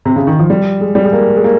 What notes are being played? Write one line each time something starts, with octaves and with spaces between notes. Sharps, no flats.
C3
C#3
D#3
F3
G3
G#3
G3
G#3
A#3
G#3
A#3